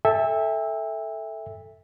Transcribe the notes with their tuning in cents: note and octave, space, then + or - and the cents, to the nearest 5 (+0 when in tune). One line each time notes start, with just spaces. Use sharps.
A4 +0 E5 -10 G5 +45